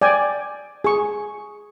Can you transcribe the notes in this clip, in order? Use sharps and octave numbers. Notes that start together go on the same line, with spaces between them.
D5 G5 G#5
G#4 C#6